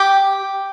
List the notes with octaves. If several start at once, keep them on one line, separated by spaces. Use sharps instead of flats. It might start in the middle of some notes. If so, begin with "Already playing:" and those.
Already playing: G4